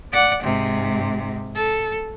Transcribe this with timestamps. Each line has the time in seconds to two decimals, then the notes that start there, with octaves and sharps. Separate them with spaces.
0.12 D5 F#5
0.43 G#2 C3
1.55 A4